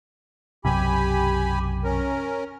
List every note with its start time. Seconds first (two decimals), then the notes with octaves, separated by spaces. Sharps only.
0.65 B1 F#2 C3 G4 G#5 B5
1.84 C#4 A#4